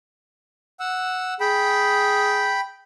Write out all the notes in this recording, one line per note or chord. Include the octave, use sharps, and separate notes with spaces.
F#5 E6
G#4 G5 B5